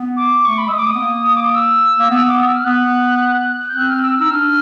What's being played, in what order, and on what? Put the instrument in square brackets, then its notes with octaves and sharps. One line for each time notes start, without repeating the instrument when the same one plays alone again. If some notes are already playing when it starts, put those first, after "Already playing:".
Already playing: [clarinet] B3
[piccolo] D6
[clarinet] A3 [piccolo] C#6
[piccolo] B5
[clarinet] G#3 [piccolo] E6
[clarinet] A3 [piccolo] D#6
[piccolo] D6
D#6
[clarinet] B3
A#3
[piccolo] D6
D#6
E6
[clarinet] A#3
B3
[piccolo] D6
D#6
E6
F6
[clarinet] B3 [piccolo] F#6
[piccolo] G6
[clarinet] C4 [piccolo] F#6
[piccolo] F6
E6
[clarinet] D#4 [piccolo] E6
[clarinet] D4 [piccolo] F6